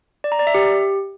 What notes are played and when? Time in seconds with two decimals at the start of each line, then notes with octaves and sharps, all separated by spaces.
0.24 D5
0.32 A#5
0.39 D5
0.47 E5
0.54 G4